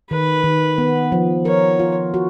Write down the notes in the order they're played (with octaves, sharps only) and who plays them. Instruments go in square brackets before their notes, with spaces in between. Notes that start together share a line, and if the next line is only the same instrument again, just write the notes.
[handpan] D#3 [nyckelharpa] B4
[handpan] D#3
B3
F3
[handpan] A#4 [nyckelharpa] C#5
[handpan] F4
F#4